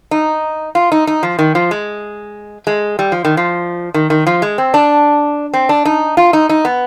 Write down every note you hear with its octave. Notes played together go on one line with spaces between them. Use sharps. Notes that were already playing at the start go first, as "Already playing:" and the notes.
D#4
F4
D#4
D#4
F3
D#3
F3
G#3
G#3
G3
F3
D#3
F3
D#3
D#3
F3
G#3
C4
D4
C4
D4
D#4
F4
D#4
D#4
B3